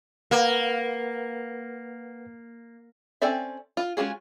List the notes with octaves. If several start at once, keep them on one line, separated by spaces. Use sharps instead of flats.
A#3 A#4 B4 F#5
C4 C#4 A4 D5 E5
F4
G#3 C#4 F4 F#4 G#4